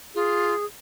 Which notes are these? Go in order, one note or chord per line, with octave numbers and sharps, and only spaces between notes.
F4 G#4